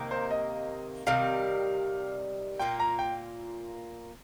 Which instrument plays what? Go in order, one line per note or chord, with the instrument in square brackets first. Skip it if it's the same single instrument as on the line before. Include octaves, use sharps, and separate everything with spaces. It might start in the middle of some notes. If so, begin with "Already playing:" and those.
Already playing: [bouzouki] C3 D#3 A#3
[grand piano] C5
D#5
[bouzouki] C3 D#3 G3 [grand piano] F5
[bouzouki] A#2 A#3 F4 [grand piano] G5
[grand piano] A#5
G5